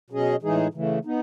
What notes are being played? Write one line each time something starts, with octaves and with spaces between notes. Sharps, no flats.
B2 F#3 C#4 G#4 D#5
A2 E3 G#3 D#4 G#4
C#3 E3 A3
B3 D#4